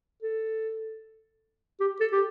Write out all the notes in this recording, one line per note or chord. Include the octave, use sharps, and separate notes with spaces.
A4
G4
A4
G4